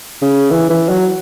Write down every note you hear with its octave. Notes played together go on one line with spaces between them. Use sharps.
C#3
E3
E3
F#3